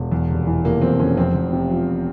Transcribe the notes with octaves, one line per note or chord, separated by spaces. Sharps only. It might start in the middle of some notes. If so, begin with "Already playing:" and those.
Already playing: E1
E2
F1
E3
F1 A#3
E2 C4
F1 C#4
F2 C4
F1
C3
F3